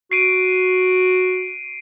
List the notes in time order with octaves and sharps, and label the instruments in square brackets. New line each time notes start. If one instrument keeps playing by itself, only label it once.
[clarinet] F#4 [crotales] C7 D7 D#7